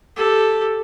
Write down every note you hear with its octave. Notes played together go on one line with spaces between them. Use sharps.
G4 A4